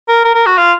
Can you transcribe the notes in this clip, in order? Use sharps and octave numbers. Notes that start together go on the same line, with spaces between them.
A#4
A#4
A#4
F#4
F4